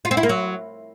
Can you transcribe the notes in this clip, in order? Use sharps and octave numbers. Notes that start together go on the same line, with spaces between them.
F4
C4
E4
A#3
F#3